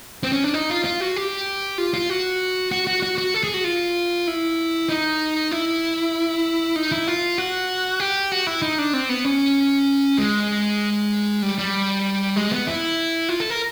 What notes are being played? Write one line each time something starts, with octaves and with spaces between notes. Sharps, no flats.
C4
C#4
D4
D#4
F4
F4
F#4
G4
F4
F4
F#4
F#4
F#4
F#4
F#4
A4
G#4
F#4
F4
E4
D#4
E4
D#4
E4
F4
F#4
G4
F#4
E4
D#4
D4
C4
B3
C#4
G#3
G3
G3
G#3
B3
E4
F4
A4
A#4